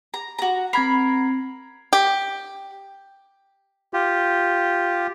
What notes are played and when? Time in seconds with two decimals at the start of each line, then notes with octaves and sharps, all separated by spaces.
0.14 A#5
0.39 F#4 A#5
0.73 C4 A#4 A#5 B5 G#6 C7
1.93 G4
3.93 F4 G4